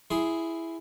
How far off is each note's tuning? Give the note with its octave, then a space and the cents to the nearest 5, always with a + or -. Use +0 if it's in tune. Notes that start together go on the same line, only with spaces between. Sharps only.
E4 +5 G#4 +0 C6 +0